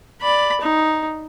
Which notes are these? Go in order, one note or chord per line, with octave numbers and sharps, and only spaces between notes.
D5 B5
D#4